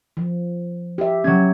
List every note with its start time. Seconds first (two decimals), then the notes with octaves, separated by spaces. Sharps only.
0.17 F3
0.98 G4 E5
1.24 F#3 C#4 G#6